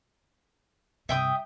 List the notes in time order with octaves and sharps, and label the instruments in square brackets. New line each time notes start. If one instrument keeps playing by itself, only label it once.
[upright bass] G2 C3 [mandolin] E5 G5 D#6